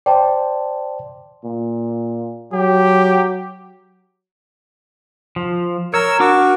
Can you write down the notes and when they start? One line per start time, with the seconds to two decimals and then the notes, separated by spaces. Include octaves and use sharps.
0.06 C5 D5 G5 A5 C6
1.44 A#2
2.53 F#3 G4
5.36 F3
5.94 A#4 C#5 E6
6.20 D4 F#4 A#4 D6